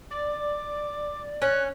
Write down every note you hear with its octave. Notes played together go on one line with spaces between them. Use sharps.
D5 D6
C#4 F#6